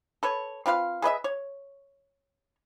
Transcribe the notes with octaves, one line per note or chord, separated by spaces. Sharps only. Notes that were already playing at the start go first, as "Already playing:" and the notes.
A4 B4 C#5
C4 F4 B4 F5
G#4 B4 D#5 E5
C#5